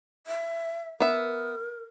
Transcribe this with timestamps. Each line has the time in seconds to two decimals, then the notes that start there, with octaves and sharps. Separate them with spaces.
0.27 E5
1.00 B3 A#4 E5